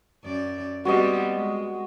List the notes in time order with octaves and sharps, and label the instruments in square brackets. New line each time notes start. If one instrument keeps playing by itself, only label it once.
[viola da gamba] F#2 D5
[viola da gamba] G3 B3 C4 [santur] F#4 D#5
[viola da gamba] G#3